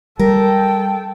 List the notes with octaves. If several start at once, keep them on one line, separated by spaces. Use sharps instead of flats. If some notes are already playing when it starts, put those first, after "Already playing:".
G3 A4 A#4 G5